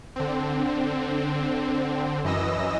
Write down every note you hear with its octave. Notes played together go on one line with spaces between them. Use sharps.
D3 C4
F#2 E3 D#5 E6 A#6